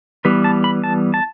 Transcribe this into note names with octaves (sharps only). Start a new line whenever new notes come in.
E3 G3 B3 B4
A5
B5
A5
A5